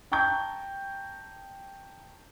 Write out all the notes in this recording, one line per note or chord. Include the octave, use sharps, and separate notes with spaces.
G5 A5 A#5 C#6 G6